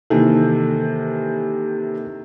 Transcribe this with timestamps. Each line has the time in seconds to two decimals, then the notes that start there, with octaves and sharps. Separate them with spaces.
0.10 C3 D#3 E3 A#3 A4